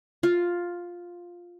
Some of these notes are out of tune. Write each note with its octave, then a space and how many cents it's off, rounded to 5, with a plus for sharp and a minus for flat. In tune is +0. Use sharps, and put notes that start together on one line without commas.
F4 +5